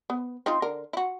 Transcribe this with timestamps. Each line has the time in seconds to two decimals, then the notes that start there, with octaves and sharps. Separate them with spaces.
0.10 B3
0.46 C4 D#4 F4
0.62 D3 A#4
0.93 E4 F#4